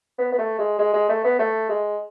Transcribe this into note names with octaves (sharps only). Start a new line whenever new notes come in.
B3
B3
A3
G#3
G#3
G#3
A3
B3
A3
G#3